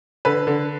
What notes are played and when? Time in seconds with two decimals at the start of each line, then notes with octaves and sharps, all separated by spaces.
0.25 D3 B4
0.47 D3